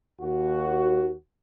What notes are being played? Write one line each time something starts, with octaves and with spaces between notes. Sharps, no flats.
D#2 F#4